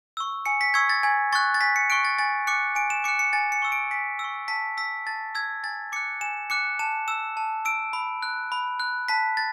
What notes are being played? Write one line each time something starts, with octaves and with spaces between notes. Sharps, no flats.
C#6 E6
G#5 C#7
B6
C#6 E6 G#6
A6
G#5 G#6
C#6 F#6 A6
A6
G#5 B6
C#7
C#6 F#6 D7
A6
G#5 A6
D6 F#6 C#7
G#5 D7
E7
D6 F#6 C#7
C#7
G#5 A6
C#7
C#6 E6
D7
G#5 B6
E6
C#6
A5 B6
E6 B6
A5 A6
E6 G#6
G#5 A6
D6 F#6 C#7
G#5 E7
D6 F#6 C#7
A5 E7
E6 E7
A5
E6 D7
B5
F#6
B5
F#6
A5 B6
A6